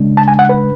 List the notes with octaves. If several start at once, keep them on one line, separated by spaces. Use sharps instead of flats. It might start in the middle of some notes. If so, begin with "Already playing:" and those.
Already playing: C#3 G#3 D4
A5
G#5
F#5
B4